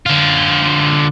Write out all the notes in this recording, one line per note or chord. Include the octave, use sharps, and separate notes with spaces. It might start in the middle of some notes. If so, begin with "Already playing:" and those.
D3 F4